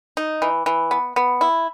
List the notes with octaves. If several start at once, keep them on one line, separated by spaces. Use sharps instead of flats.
D#4
E3
E3
B3
B3
E4